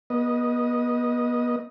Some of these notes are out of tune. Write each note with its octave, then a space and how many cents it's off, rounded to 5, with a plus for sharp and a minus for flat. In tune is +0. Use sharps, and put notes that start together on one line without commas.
B3 -35 D#5 +0